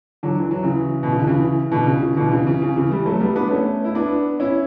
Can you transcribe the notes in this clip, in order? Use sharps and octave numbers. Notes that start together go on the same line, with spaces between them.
D3 F#3
E3
F#3
C#3 E3
B2
C#3
D3
C#3 E3
B2 D3
C#3
C#3
B2 D3
C#3 E3
C#3
C#3
C#3 E3
E3 G3
F#3 A3
G3 B3
B3 D4
A3 C#4
E4
B3 D4
C#4 E4